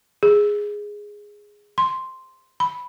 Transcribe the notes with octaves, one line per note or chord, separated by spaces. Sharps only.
G#4
C6
B5